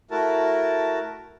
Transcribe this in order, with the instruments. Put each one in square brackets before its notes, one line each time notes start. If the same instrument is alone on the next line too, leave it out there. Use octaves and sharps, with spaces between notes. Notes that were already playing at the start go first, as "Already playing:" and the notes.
[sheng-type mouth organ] A3 E4 F#4 A#4 A5